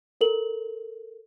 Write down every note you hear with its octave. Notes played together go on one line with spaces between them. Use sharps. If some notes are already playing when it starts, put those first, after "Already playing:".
A4 A#4 F#7